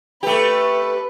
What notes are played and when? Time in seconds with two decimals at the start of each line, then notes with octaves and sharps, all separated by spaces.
0.23 A3 G4 B4